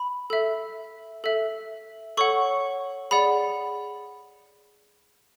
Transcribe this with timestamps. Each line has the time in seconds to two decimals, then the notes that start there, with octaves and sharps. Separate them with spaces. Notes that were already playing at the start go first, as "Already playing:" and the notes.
Already playing: B5
0.30 A4 E5
1.24 A4 E5
2.17 A4 C#5 F#5 C#6
3.11 G#4 D5 F#5 B5